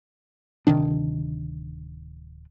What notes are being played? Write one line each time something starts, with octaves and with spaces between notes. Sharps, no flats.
D1 C3 D#3 D4